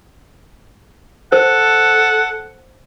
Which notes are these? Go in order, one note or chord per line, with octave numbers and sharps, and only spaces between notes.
A4 C5 F#5